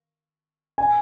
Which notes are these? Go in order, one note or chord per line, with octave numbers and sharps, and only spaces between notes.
G#5